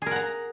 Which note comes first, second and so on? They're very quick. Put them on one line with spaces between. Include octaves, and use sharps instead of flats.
G#4 A#4 F#5 A#5